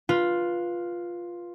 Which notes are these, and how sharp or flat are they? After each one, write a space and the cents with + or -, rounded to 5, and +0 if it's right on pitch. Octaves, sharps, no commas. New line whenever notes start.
F4 +0 B4 -15